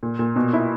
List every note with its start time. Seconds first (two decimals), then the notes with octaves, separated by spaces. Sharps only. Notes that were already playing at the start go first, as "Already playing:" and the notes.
0.03 A#2
0.19 A#2
0.36 B2
0.53 E4